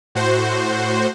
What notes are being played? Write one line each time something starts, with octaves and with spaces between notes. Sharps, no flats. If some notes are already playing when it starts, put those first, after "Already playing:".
A2 F#4 C5